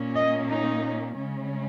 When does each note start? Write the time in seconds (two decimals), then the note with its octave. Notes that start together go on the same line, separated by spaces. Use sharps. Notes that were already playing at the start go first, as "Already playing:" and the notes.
Already playing: A#2 A#3 C#4
0.16 D#5
0.49 D#4
1.16 C#3 G#3 C#4